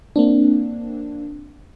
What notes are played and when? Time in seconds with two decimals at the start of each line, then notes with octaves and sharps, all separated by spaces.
0.16 A#3 C4 D4